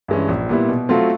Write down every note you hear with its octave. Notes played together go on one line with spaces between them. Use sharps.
G2 E3 G#3 C#4
A#1
A#2 G3 B3 E4
B2
F#3 A3 C4 F4